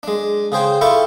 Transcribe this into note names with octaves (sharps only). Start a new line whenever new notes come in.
G#3 D4
C#3 G#4 C5 G5
E4 F4 A4 G5 B5 C#6